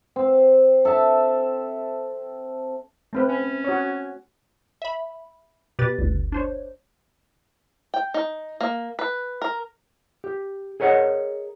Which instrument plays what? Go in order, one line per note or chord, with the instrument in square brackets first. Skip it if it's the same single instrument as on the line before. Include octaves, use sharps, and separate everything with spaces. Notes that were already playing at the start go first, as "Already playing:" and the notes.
[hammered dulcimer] C4
A4 E5 A5
[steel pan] A3 C4 B4
[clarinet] C#4
[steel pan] F#4 C#5
[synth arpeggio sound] E5 B5
B2 G4 B4 A6
G1 D2
D4 C5 C#5
[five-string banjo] G5
D#4
A#3
B4
A#4
[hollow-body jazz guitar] G4
G#4 A#4 C#5 D#5 F#5